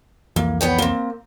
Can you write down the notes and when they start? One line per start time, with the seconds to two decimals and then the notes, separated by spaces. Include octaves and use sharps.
0.36 C2 F2 E3 A#3
0.61 B3 C#5 G5
0.78 A#3 C4